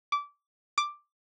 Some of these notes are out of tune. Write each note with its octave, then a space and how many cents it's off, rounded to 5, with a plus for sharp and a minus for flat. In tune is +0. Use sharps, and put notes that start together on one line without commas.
D6 -20
D6 +5